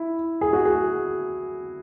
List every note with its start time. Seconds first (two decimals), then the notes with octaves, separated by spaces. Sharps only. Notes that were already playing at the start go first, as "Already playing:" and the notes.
Already playing: E4
0.41 G#4
0.53 F#4
0.65 G#4